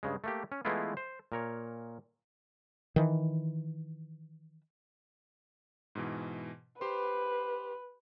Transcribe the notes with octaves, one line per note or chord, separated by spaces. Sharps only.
G2 C#3 G#3
A3 A#3 G4
C#4
E3 G#3 A3 B3 E4 F4
C5
A#2 A#4 C#5
D#3 E3
G#2 B2 E3
G4 B4 C5 C6